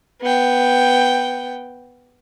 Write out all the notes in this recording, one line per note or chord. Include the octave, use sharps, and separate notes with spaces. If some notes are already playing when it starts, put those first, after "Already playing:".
B3 G5